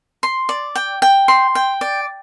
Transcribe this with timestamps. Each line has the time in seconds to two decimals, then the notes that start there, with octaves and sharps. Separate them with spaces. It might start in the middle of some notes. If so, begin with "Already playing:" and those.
0.23 C6
0.49 D5
0.75 G5
1.02 G5
1.28 C6
1.55 G5
1.81 D5